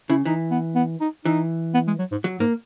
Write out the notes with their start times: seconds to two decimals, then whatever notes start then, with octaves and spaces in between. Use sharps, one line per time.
0.10 C#3 E4
0.25 E3 D#4
0.51 B3
0.75 B3
1.01 D#4
1.25 E3 D#4
1.74 B3
1.87 G#3
1.99 F#3
2.12 G#2
2.24 F#3
2.40 G#2 A#3